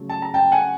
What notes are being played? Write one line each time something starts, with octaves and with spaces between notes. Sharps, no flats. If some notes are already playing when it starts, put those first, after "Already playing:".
Already playing: C#3 F#3 A3
A5
A#5
G5 A5
F#5 G#5